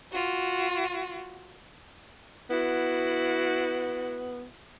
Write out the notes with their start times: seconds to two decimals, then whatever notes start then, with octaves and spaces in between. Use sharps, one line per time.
0.12 F4 F#4
2.50 B3 E4 F#4